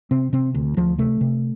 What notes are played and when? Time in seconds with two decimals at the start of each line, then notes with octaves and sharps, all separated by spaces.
0.11 C3 C4
0.33 C3 C4
0.54 D2
0.77 D2 F3
0.98 C3 A3
1.21 C3